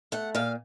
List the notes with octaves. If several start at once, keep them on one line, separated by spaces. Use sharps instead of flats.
A3 F#5
A#2 F5